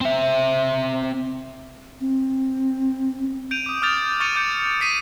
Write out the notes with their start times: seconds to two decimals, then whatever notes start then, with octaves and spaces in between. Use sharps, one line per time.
0.01 C4 E5
2.00 C4
3.51 G6 D7 D#7 F7
3.66 D6 D#6
3.82 D6 D#6 F6 G6 A6 F7
4.20 C#6 F6 A6 C#7 D#7 F7
4.35 D6 G6 C#7 D7
4.80 D#6 A6 B6 C7 D7 D#7